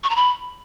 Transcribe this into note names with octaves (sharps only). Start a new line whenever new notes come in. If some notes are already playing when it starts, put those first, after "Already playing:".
C#6
A#5
B5